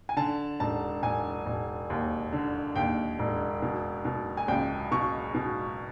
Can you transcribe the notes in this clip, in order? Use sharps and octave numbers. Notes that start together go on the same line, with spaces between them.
G#5
D3 A5
E1 A5
E1 G#5
E1
D#2
D3
D#2 G5
E1
B2
B2
G#5
C#2 G5
B2 C#6
B2